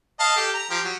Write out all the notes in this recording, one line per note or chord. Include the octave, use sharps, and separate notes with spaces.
D#5 F5 A5
G4 A4
A#5
F3 G4
F#3